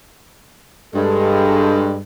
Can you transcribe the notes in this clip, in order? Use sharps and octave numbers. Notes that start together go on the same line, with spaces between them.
G2 G#3 A4